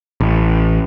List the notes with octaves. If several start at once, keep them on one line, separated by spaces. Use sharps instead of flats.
A1